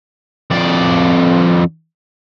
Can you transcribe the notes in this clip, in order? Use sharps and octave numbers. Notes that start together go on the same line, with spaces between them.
F2 D5